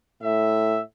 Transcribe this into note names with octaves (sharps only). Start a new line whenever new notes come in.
A2 E5